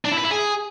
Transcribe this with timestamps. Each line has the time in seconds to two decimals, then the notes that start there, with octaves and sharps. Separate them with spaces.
0.05 D4
0.11 E4
0.18 B4
0.25 E4
0.32 G#4